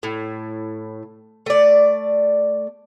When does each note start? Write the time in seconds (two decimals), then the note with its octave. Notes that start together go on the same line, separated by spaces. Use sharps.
0.03 A2
1.46 A3 D5